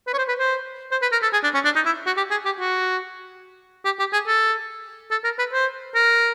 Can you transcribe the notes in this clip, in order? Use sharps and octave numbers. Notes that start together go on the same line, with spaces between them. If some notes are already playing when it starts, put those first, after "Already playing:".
B4
C#5
C5
B4
C5
C5
B4
A#4
A4
G#4
D4
C#4
D4
D#4
E4
F#4
G4
G#4
G4
F#4
G4
G4
G#4
A4
A4
A#4
B4
C5
A#4